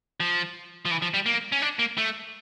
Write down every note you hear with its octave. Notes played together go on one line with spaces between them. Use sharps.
F3
F3
E3
F3
G3
A#3
C#4
D4
A#3
A3